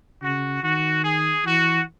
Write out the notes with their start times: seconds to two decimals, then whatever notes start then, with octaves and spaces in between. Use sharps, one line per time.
0.22 C#3 F#4
0.63 D#3 F#4
1.05 G#4
1.45 E3 F#4